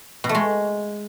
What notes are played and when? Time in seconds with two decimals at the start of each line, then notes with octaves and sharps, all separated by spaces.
0.24 B2
0.29 A3
0.35 G#3